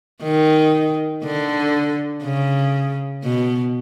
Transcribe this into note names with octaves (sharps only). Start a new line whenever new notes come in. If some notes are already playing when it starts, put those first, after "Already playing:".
D#3
D3
C#3
B2